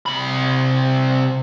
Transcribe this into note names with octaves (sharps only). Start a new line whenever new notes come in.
C3 B5